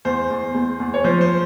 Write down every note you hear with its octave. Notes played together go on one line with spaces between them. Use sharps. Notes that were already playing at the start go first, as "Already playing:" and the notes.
E2 C5
E2
E2
E2
C#5
F3 C5
C5